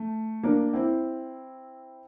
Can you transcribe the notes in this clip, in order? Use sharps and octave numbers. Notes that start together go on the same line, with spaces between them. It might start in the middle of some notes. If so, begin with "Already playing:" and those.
Already playing: A3
A#3 D4
C4 E4